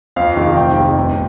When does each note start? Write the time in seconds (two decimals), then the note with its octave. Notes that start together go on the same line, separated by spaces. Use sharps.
0.16 F2 F5
0.37 C3 D#3
0.56 F1 G5
0.76 F2 C3
0.97 G1